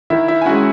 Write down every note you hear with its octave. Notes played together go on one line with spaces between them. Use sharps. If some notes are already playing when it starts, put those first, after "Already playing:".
D#3 E4 E5
E4 E5
G#5
G#3 C#4 F#4 F#5